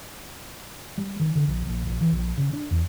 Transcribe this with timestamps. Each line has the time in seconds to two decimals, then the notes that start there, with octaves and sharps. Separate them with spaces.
0.98 G3
1.20 D#3
1.35 D3
1.47 A#1
1.66 A#1
1.86 A#1
2.01 E3
2.12 A#1
2.38 C#3
2.53 D4
2.71 E2